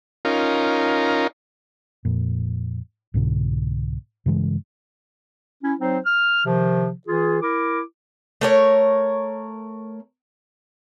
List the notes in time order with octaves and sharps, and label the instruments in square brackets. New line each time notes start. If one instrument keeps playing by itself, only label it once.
[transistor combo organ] C#4 D#4 F4 A#4
[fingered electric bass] F2 A#2
C2 G#2 B2 D3
G2 C#3 E3 G#3
[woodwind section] C#4 E4
F#3 C4 D#4 C5
F6
C3 D#3 F3
E3 F4 G#4
E4 A#4 D6
[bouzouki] A3 A#4 C#5